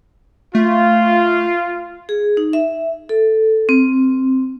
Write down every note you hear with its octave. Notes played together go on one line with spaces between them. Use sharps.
A3 F4
G#4
D#4
E5
A4
C4